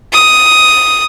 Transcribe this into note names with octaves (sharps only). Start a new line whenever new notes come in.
D#6